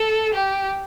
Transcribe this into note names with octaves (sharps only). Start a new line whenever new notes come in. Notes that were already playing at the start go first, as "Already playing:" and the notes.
Already playing: A4
G4